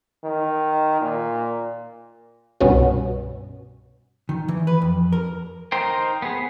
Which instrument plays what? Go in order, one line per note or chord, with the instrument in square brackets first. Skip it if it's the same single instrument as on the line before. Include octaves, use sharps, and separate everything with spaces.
[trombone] D#3
A#2
[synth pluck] C2 G2 B2 C#4 F#4
[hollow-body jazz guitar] D#3
E3
B4
F2
A#4
[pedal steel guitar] D#4 A#4 C5 G5
B3 G#4